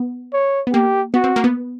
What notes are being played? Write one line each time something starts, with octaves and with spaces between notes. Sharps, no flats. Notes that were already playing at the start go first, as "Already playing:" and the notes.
Already playing: B3
C#5
B3
A#3 G4
B3 F#4
C4
A#3
B3